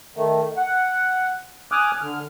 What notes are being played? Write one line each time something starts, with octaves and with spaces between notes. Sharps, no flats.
D#3 A3
F#5
G#5 D6 D#6 F6 F#6
D3 F6